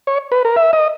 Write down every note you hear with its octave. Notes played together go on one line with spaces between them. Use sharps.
C#5
B4
A#4
E5
D#5